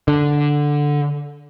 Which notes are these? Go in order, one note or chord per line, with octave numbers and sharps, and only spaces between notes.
D3